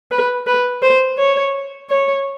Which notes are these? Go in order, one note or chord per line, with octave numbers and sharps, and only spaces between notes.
B4
B4
C5
C#5
C#5